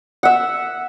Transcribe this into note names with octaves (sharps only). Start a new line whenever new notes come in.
E5 F#5